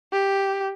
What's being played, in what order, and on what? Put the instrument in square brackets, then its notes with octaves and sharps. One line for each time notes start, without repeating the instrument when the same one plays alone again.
[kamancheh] G4